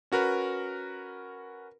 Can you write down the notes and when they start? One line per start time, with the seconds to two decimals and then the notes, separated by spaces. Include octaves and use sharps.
0.12 C#4 F#4 A#4 B4